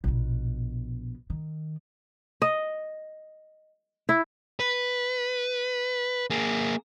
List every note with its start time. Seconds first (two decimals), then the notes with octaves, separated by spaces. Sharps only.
0.04 A#1 B2
1.30 D#3
2.42 D#5
4.09 E4
4.60 B4
6.30 A#3 G#4